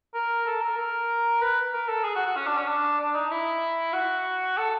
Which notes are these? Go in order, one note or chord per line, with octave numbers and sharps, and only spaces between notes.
A#4
A4
A#4
A#4
B4
A#4
A4
G#4
F#4
F#4
C#4
D4
C#4
D4
D4
D#4
E4
F#4
A4